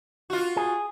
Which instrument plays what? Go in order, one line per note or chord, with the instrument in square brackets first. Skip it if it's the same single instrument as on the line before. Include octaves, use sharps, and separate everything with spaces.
[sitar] F4 F#4
[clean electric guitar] G#4